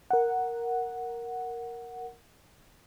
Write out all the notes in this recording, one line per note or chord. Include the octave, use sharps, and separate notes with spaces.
A#4 F#5